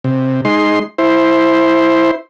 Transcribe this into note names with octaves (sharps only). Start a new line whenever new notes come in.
C3
G#3 D#4 C6
E4 C5